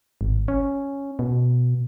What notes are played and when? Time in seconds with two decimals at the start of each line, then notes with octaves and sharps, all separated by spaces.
0.21 G#1
0.48 C#4
1.19 B2